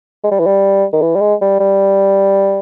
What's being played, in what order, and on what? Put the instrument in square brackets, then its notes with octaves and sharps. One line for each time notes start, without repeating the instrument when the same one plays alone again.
[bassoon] G#3
G3
E3
G3
D#3
E3
G3
G#3
G3
G3